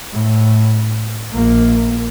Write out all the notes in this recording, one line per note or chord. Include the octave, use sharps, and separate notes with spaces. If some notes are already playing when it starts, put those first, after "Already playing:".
A2
A#1 A#3